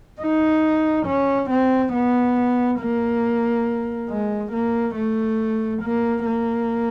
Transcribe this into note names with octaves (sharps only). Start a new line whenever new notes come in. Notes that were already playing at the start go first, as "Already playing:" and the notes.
D#4
C#4
C4
B3
A#3
G#3
A#3
A3
A#3
A#3